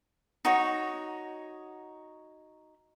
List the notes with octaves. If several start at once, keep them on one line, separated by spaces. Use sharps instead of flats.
D#4 F#4 C#5